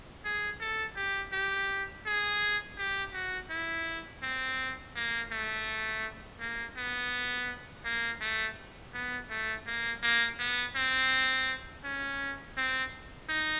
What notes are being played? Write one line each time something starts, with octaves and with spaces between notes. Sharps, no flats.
G#4
A4
G4
G4
G#4
G4
F#4
E4
C4
A#3
A3
A#3
B3
A#3
A3
B3
A3
A#3
A#3
B3
C4
C#4
C4
D#4